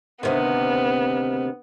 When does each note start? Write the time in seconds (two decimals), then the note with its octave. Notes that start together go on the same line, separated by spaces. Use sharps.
0.23 D2 C3 D#3 B3